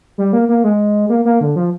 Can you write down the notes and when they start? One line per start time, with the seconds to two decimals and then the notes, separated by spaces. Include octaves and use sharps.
0.18 G3
0.33 A#3
0.49 A#3
0.64 G#3
1.09 A#3
1.25 A#3
1.41 D3
1.56 F3